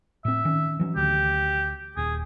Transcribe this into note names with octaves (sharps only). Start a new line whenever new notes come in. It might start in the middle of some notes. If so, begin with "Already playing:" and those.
A2 C4 E5
D#3 C#4
E3 F#3 C#4
D2 G4
D#1 G#4